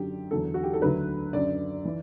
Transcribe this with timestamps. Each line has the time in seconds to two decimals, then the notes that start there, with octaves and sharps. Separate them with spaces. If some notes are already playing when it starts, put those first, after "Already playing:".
Already playing: F#2 D3 F#3 G4
0.31 E2 D3 F#3 A4
0.54 F#4
0.63 G4
0.73 A4
0.82 D2 D3 F#3 B4
1.33 F#2 D3 F#3 D5
1.85 E3